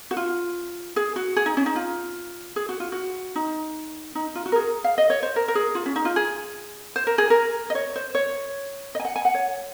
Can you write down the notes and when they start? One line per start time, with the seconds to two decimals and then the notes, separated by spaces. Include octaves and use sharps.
0.11 F#4
0.17 F4
0.96 G#4
1.16 F#4
1.36 G#4
1.46 D#4
1.57 C#4
1.66 D#4
1.76 F4
2.56 G#4
2.69 F#4
2.80 F4
2.92 F#4
3.36 D#4
4.15 D#4
4.35 F4
4.46 F#4
4.52 A#4
4.56 G#4
4.84 F5
4.98 D#5
5.10 C#5
5.23 C5
5.36 A#4
5.48 A#4
5.55 G#4
5.75 F4
5.86 C#4
5.96 D#4
6.05 F4
6.16 G#4
6.96 C5
7.07 A#4
7.18 G#4
7.30 A#4
7.70 D#5
7.75 C#5
7.96 C5
8.15 C#5
8.95 D#5
9.00 G#5
9.05 F#5
9.16 G#5
9.25 F#5
9.34 C#5